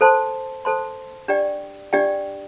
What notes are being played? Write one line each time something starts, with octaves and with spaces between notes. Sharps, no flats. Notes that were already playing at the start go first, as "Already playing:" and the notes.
A4 C5 A5 C6
A4 C5 A5 C6
D4 G4 D5 G5
D4 G4 D5 G5